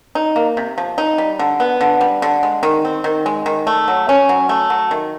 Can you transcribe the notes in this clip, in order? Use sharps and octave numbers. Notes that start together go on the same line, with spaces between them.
D#4
A#3
C3
F3
D#4
G3
D3
B3
D3
G3
D3
G#3
D#3
C4
D#3
G#3
D#3
A3
F#3
C#4
F#3
A3
F#3
D#3